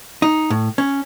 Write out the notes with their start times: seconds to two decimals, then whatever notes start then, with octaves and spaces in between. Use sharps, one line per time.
0.22 D#4
0.50 A2
0.78 C#4